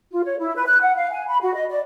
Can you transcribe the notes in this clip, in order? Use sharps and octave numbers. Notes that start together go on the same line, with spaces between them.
F4
C#5
E4
B4
F#6
F#5
F5
G#5
B5
F#4
D#5
D5